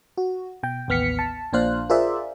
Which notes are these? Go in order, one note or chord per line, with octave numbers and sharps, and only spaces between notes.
F#4
B2 G5
A1 D#2 B3 F6 B6 C#7
A5
A#1 A#2 D4 C5 F5 F#6
F4 G#4 A#4 C5 D5 E5